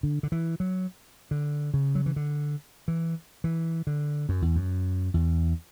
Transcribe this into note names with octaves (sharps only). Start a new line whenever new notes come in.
D3
D3
E3
F#3
D3
C#3
F#3
E3
D3
E3
E3
D3
F#2
E2
F#2
E2